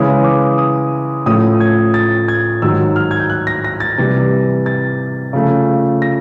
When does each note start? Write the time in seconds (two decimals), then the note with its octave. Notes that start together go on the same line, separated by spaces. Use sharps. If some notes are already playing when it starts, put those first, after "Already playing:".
Already playing: C#3 E3 G#3 C#4 E4 D#6
0.24 D6
0.58 D#6
1.26 A2 F3 A3 C#4 D#6
1.60 G#6
1.94 A6
2.28 G#6
2.62 G#2 D#3 F#3 E6
2.96 F6
3.11 G#6
3.20 G6
3.30 F#6
3.47 A#6
3.64 A#6
3.80 A6
3.98 C3 E3 G3
4.66 A6
5.33 C#3 F3 A3
6.02 A#6